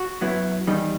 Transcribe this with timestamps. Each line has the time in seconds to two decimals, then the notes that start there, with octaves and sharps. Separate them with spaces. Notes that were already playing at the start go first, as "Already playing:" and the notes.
Already playing: F#4
0.21 F#2 F#3 B3 E4
0.67 E2 D#3 G3 D#4